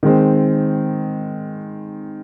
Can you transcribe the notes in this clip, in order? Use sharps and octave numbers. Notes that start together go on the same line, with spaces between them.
D#3 G#3 C4